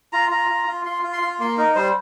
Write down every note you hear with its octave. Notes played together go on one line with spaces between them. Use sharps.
F4 A#5
F4 A#5
F4
F4
F4 C6
F4
C6
F4
A#3 C6
D#4 A#4
G3 C5